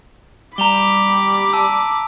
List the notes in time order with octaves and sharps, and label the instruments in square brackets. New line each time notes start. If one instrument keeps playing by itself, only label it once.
[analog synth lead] G3 [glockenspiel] A#5 F7 G7 [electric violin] B5 D6
[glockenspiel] A5 E6